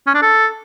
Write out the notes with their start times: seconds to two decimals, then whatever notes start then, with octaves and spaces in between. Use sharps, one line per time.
0.07 C#4
0.14 D4
0.22 A4